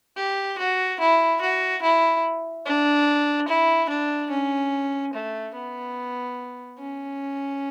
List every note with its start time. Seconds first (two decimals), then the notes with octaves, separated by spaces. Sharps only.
0.17 G4
0.59 F#4
1.00 E4
1.41 F#4
1.83 E4
2.66 D4
3.48 E4
3.90 D4
4.31 C#4
5.14 A3
5.55 B3
6.79 C#4